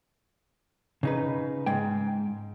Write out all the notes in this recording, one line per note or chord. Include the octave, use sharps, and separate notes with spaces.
C#3 D#4 B4
G#2 G#3 G5